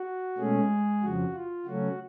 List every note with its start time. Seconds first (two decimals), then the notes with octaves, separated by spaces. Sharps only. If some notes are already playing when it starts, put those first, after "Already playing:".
Already playing: F#4
0.37 B2 G#3 A3 C#4 G#4
1.02 F2 C#3 F3 F#4
1.33 F4
1.66 C#3 F#3 A3 C#4 F#4